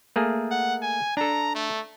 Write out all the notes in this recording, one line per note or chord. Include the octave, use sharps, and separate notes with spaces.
A3 A#3 G#4
F#5
G#5
D4 A4 A#5
A3